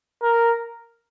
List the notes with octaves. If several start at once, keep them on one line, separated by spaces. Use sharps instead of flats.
A#4